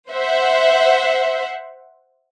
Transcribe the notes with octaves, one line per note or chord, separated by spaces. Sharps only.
C5 E5 F#5